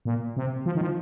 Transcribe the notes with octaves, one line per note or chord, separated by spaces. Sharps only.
A#2
C3
F3
D#3
F3